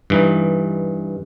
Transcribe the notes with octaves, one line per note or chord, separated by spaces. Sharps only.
G2 E3 D#4